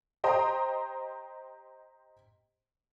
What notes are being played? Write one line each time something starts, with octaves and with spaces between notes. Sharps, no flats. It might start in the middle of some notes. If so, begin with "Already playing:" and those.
G4 C5 D#5 G5 A#5 C6